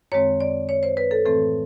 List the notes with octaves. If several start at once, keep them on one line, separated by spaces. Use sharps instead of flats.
F#2 D#3 G#3 C4 C#5
D5
C#5
C5
B4
A4
A2 E3 A3 C4 A4